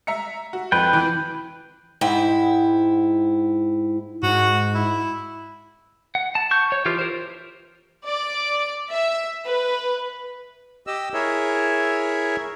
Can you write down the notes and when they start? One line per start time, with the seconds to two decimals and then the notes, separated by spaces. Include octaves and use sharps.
0.07 E5 A#5 C#7
0.53 F#4
0.72 F2 B4 G5
0.93 E3 D7
2.01 G#2 E4 G5
4.23 G#2 F#4
4.75 E4
6.15 F#5
6.35 A5
6.51 C#6 G6
6.72 C#5
6.85 E3 F4 G4 F6
6.99 A#4 C5
8.05 D5
8.90 E5
9.47 B4
10.87 G4 D#5 E6
11.14 E4 G#4 A#4 C#5 E5